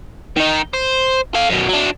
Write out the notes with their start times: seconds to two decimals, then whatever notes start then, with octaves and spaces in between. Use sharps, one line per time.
0.37 D#3 D#4
0.74 C5
1.35 A4 F5
1.50 F#2 B2
1.69 F#3 D4